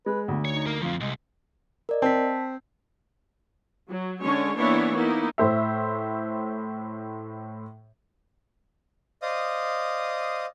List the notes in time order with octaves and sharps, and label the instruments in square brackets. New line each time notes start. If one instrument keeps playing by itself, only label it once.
[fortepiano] G#3 [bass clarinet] B4
[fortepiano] D2 [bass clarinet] B3
[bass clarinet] D#4 [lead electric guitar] C#5
[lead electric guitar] A#4 F5
[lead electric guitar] F3 C4 [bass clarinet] F4
[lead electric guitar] C2 [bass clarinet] G#3
[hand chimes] A#4 D5 D#5
[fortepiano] C4 [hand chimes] A5 B6
[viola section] F#3
D3 G#3 C#4 C#5
E3 A#3 B3 D4 E4 C#5
A#3 B3 D#4 E4
[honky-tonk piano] A2 C5 E5
[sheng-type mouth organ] C5 D5 D#5 F5 D#6